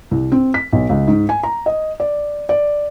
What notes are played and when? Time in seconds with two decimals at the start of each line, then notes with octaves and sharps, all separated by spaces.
0.11 C2
0.32 C4
0.54 B6
0.73 B1
0.89 C#2
1.07 G#2
1.29 G#5
1.43 A#5
1.66 D#5
2.00 D5
2.49 D5